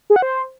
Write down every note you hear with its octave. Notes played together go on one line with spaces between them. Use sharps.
G#4
F#5
C5